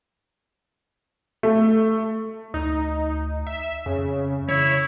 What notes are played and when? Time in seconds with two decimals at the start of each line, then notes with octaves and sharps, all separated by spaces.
1.43 A3
2.54 D2 D#4
3.47 E5
3.86 F2 C#3
4.49 C#3 E4 C#5